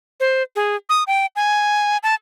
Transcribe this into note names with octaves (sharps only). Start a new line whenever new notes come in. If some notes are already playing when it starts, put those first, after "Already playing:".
C5
G#4
D#6
G5
G#5
A5